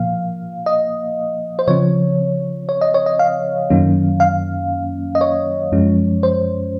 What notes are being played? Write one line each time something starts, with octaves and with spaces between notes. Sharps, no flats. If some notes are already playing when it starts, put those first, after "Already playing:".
Already playing: A#2 F3 A#3 F5
D#5
C5
C#3 F3 C4 C#5
C#5
D#5
C#5
D#5
F5
F#2 D#3 F#3 A#3 C#4
F5
D#5
C#5
F#2 F3 G#3 C#4
C5